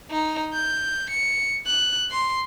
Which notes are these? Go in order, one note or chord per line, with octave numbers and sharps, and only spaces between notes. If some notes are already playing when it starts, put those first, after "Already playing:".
D#4
G6
C#7
F#6
C6